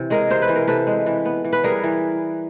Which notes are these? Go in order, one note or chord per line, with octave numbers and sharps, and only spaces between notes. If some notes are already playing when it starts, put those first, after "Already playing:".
Already playing: C3 E3
G#3 G#4 A#4
C3 C5
B4
E3
A#4
C3 A4 B4
G#3
E3
B3
E3
B4
G3 G#4 A#4
E3